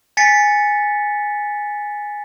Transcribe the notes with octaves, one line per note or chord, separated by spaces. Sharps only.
G#5 A6 B6 C#7